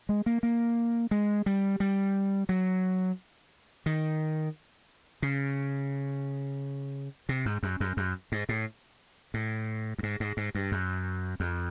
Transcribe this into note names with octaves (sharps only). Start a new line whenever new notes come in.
G#3
A#3
A#3
G#3
G3
G3
F#3
D#3
C#3
C3
G#2
F#2
F#2
F#2
G#2
A2
A2
G2
G#2
G#2
G#2
G2
F#2
F2